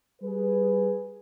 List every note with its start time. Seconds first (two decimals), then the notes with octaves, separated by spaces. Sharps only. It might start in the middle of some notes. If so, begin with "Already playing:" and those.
0.21 G3 G#4 B4